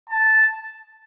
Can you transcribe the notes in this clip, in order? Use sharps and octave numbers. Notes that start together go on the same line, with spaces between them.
A5